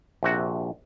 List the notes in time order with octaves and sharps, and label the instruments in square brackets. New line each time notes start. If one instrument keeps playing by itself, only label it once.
[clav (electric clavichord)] A#1 C3 F#4